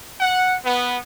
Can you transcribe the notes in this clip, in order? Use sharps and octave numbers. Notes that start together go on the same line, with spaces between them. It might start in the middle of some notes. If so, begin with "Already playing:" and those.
F#5
B3